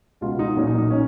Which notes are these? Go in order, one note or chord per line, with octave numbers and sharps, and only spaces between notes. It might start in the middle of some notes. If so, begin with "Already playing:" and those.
C#2 B2 F4
D#4
B1 A#2 C#4
D#4
D#4
C#4